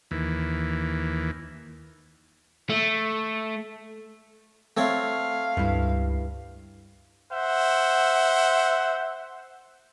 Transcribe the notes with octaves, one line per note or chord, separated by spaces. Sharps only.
D#2 E3
A3
A3 C4 C#5 F5
C#2 G2 E4
C5 E5 F#5